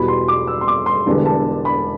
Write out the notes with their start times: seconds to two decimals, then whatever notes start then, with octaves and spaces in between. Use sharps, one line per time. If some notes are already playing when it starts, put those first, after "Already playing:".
Already playing: E2 B2 G3 B5
0.08 C6
0.28 D6
0.47 E6
0.61 C6
0.68 D6
0.86 C6
1.06 E1 E2 D3 G3
1.26 A5
1.65 B5